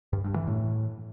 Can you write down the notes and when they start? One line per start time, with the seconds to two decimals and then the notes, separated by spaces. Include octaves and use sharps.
0.13 G2
0.24 G2
0.36 E3
0.47 A2